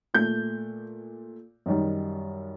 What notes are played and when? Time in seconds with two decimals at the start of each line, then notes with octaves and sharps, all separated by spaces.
0.14 A#2 A3 G6
1.66 F#2 D#3 G3